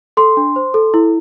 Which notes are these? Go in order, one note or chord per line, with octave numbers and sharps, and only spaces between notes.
A4 C6
D4
C5
A4
E4